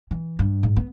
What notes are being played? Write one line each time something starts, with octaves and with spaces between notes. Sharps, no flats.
E3
G2
G#2
B3